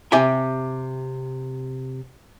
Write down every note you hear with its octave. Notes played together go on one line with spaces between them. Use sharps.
C3 G4 E5 G#5